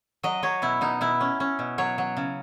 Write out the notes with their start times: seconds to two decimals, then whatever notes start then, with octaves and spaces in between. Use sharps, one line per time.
0.23 F#3 D#5
0.43 F#3 C#5
0.62 B2 E4
0.81 B2 D#4
1.01 B2 E4
1.21 C#4
1.40 C#4
1.59 B2
1.78 F#3 C#5
1.98 F#3
2.17 C#3